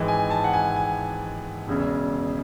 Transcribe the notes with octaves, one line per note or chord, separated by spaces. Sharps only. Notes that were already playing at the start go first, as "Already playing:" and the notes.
Already playing: G#1 G#2 E3 G#3
G#5
A5
F#5
G#5
G#5
E1 E2 C#3